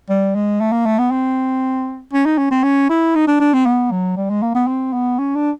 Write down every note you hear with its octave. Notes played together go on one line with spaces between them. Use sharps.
G3
G#3
A3
A#3
A3
B3
C4
C#4
D#4
C#4
C4
C#4
E4
D#4
D4
D4
C4
B3
F#3
G3
G#3
A#3
B3
C4
B3
C#4
D4